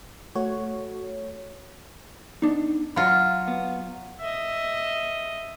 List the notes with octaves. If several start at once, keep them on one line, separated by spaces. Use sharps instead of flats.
A3 F#4 C#5
B3 D4 D#4
F#3 F4 D#5 F5 B5
B3
D#5 E5